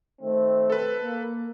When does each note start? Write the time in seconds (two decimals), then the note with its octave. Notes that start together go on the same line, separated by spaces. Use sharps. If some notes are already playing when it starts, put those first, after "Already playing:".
0.22 D#3 A3 C4
0.70 A4 B4
1.03 A#3